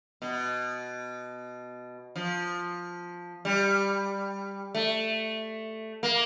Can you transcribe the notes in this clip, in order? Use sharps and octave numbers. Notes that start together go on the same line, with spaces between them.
B2
F3
G3
A3
A#3